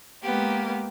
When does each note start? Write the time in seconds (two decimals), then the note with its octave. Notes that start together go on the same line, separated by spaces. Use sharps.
0.22 G#3 A#3 B3 G4